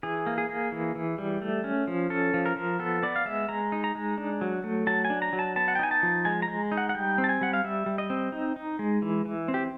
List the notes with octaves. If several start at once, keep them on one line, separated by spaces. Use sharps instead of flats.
E3 G#4
A#3
G#4
A#3
E3
E3
G3
A3
C#4
F3
C#4 A4
F3
A#4
F3
B3 A4
B3 D5
F5
G#3 E5
G#3 A#5
D#4
A#5
G#3
D4
F#3
A3
F#3 A5
G#5
D4
A#5
F#3
A5
B3 A5
F#5
G5
D#4 G#5
A5
F3
G#3 G#5
A#5
G#3
D#4
F#5
F#5
G3 G5
C4
A5
G#5
G3 F#5
F5
G3 E5
G3
D#5
C4
D#4
D#4
G#3
E3
E3
C4
G4